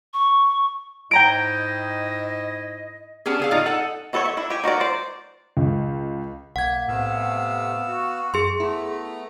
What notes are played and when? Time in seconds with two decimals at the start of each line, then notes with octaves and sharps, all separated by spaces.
0.14 C#6
1.11 G#2 E4 D#5 G5 A#5 D7
3.26 B3 C#4 D4 G4 G#4
3.40 D3 G#4 F5
3.51 A2 D#4 F4 D5
3.66 D#4 A4 F#5
4.13 E3 B3 A4 B4 C#5
4.25 E5
4.37 D4 E4
4.50 G4 G#5
4.64 D#4 F#4 A#4 D5
4.80 C5 D5
5.57 C#2
6.56 B1 A#3 F#5 G#6
6.88 A2 C3 A3 B3 F5 E6
7.88 F#4
8.34 F#2 G#4 C6
8.60 A3 B3 E4 A#5